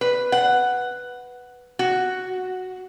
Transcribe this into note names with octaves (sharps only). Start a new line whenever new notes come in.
B4
F#5
F#4